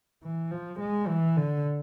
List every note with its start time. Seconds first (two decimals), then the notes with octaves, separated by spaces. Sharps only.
0.23 E3
0.51 F3
0.80 G#3
1.08 E3
1.36 D3